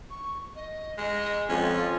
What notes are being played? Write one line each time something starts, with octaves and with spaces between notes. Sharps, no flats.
C#6
D#5
G#3 D#5
F2 C#4 F4